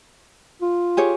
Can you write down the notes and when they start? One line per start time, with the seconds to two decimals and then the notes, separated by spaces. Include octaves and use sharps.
0.62 F4
0.97 G4 G#4 C#5